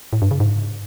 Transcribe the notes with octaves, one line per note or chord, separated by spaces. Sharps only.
A2
G2
C#3
G#2